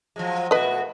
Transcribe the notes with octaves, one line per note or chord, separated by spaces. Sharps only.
F3 F#3 G#3
B2 A3 F#4 B4 D#5